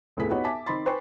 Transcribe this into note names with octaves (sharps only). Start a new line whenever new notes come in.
F1 D2 A2 B3 G#4 B6
B3 D#4 F#4 G4 B4 C#5
E5 G#5 A5 D6 B6
D#3 C4 D#4 B5 C6 A6
B4 C5 G5 G#5 B5 C#6